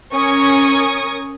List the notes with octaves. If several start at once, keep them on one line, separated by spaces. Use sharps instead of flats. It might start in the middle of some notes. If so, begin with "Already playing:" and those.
C#4 A#4 C#6 D#6 G#6